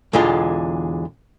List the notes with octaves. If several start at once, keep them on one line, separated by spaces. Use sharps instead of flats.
B1 E2 D3 E3 G#3 F4